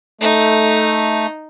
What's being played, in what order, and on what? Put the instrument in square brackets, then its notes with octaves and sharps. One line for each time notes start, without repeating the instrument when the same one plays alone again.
[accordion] A3 [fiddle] D#4